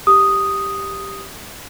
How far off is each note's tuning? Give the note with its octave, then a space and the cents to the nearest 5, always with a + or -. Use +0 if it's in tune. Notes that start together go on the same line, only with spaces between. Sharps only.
G4 +0 D#6 +0